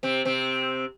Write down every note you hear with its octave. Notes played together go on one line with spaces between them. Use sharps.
C3 C4
C3 C4